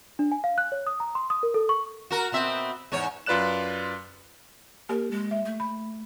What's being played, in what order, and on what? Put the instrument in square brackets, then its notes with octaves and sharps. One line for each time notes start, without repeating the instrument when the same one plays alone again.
[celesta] D4
G#5
F5
F#6
C#5
D#6
A#5
C6
D#6
A#4
A4
C#6
[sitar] F#4 A#4
B2 C4 E5
E2 G#2 C#5
[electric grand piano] F#2 F4 B4 D5 F#6 E7
[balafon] A#3 G4 [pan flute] A#4
[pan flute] G#3
[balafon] E5
[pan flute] A3
[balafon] B5